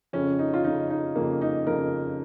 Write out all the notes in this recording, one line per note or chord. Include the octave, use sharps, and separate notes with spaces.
F2 C#3 C#4
D#4
F4
F2 C#3 D#4
D#4
F2 C#3 A#3
D#4
F2 C#3 A#4